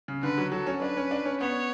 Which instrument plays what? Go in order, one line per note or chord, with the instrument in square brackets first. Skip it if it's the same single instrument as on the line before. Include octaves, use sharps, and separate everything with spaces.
[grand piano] C#3
[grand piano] D3 [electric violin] B4
[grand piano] F#3
[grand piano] F#3 [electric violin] A4
[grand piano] C#4
[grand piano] D4 [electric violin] B4
[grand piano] C#4
D4
C#4
[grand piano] B3 [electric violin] C#5